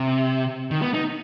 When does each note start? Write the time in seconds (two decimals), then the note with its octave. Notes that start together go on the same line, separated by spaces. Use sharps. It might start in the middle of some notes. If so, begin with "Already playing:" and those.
Already playing: C3
0.71 D#3
0.82 B3
0.94 D#4